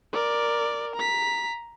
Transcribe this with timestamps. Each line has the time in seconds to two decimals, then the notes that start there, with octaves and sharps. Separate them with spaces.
0.13 A#4 D5
0.96 A#5 B6